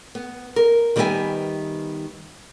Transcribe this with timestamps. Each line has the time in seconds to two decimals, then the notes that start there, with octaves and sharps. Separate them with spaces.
0.15 B3
0.56 A#4
0.96 D#3 G3 B3 A4 E5 G#5